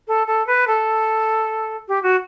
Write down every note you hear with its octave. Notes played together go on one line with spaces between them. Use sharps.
A4
A4
B4
A4
G4
F#4